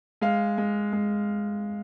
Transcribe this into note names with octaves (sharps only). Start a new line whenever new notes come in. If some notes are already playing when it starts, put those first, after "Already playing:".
G#3 F5
G#3
G#3